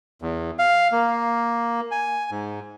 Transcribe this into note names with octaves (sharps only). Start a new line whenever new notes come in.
E2
F5
A#3
G#5
G#2